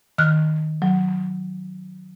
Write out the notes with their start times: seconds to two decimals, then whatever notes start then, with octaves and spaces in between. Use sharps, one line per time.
0.18 D#3 F6 F#6
0.82 F#3